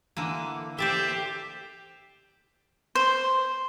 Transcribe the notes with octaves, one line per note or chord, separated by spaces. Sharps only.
D3 E3 A#3
G4 C5 D5 E5
C5